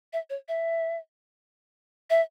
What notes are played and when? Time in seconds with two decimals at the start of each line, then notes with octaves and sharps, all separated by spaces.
0.13 E5
0.30 C#5
0.48 E5
2.10 E5